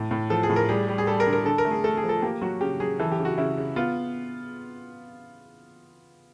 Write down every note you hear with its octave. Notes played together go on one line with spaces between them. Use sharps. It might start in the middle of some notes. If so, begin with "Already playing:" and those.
Already playing: A2
A2
F3 A4
G#4
A2
A#4
G3 G#4
G3
G#4
G3 A4
A#4
D3
A#4
D3 A4
A#4
A3
G#4
A3 A4
G#4
F3
A4
A#3 G4
F#3 F#4
C#3 G4
F#3 G#4
E3 A4
G4
C#3
F#4
C#3 E4
C#3
B3 F4